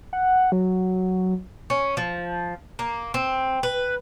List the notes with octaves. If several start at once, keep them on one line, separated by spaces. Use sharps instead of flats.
F#5
F#3
C#4
F3
A#3
C4
B4